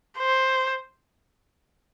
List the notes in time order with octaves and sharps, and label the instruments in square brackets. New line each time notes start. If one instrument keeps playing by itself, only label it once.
[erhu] C5